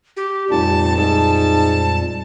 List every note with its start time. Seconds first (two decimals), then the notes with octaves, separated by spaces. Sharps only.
0.17 G4
0.50 F1 F2 A#2 G3 A5
0.97 G#2 A5